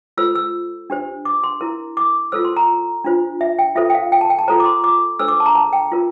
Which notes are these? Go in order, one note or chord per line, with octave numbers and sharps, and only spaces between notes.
F4 A4 C5 E6
E6
D4 G4 C5
D6
C6
E4 A#4
D6
F4 A4 C5 E6
C6
A#5
D4 F4 C5
E5
G5
F4 A4 C5 E5
G5
F5
G5
A5
G5
A5
F4 A4 C5 A#5
D6
C6
D6
D4 A4 C5 E6
D6
A5
A#5
A5
G5
F4 A#4